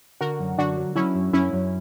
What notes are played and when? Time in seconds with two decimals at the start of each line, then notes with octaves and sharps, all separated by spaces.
0.21 D3 F#4 A#4
0.40 F#2
0.58 D3 D4 F#4
0.77 F#3
0.96 F#3 C#4 E4
1.15 F#2
1.33 F#2 C#4 E4
1.53 F#2